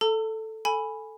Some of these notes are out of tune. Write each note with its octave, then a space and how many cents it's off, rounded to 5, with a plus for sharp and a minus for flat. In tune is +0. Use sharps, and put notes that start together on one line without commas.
A4 +0 A5 +45 E6 +0
A4 +0 G#5 +0 B5 +0